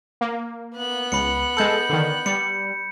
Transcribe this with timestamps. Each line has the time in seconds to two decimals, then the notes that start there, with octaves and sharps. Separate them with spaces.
0.21 A#3
0.75 B3 F#6
1.12 C#2 B5 C#7
1.57 G#3 A4 G6 C#7
1.89 D3 D#3
2.26 G3 C#7